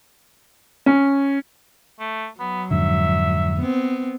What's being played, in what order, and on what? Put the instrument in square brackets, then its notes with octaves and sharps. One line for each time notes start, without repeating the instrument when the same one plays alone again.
[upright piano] C#4
[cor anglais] A3
[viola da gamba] F#3 [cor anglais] B3
[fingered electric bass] F2 G#2 D3 [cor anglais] E5
[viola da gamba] B3 C4